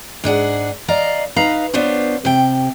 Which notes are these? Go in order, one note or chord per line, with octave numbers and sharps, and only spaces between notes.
G#2 D4 G#4 F#5
D5 D#5 F5 A#5
D#4 B4 F5 A#5
B3 D4 F4 C5 C#5
C3 G5